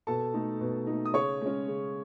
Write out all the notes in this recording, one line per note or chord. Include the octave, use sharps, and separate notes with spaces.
B2 A4 A5
A3 D#4
B2
A3 D#4
D#6
C#3 C#5 C#6
G#3 C#4
C#3